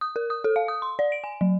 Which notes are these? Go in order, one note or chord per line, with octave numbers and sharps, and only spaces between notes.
D#6
A#4
D#6
A4
F5
D#6
C6
D5
D7
G#5
F#3